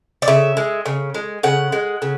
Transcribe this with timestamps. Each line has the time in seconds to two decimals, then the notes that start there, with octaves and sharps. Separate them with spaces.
0.22 D5
0.28 C#3 E5
0.57 G#3
0.86 C#3
1.14 G#3
1.43 C#3 F#5
1.72 G#3
2.02 C#3